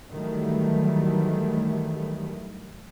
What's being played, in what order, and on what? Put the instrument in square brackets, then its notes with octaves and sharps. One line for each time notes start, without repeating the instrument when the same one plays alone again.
[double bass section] D#3 E3 F#3 G3 A3